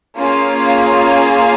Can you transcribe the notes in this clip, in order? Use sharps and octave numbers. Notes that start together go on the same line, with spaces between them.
A#3 C#4 F4 G#4 F5